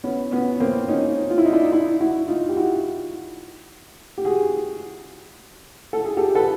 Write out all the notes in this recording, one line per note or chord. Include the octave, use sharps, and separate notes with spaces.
B3 C#4
B3 C#4
A#3 C4
C#4 D#4
F4
E4
D#4
D4 E4
D#4
D4 E4
E4 F#4
D#4 F4
G4
E4 F#4
G4
F#4 G#4
A4
G#4
G4 A4
A4 B4